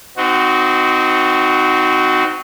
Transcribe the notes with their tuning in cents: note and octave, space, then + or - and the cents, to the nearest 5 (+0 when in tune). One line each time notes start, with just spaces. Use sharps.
C4 -25 D#4 +0 F#4 +0